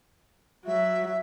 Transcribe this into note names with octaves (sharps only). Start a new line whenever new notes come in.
F#3 E5